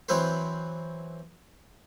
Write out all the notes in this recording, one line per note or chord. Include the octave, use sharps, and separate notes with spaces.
E3 F#3 C4 E4 B4 C5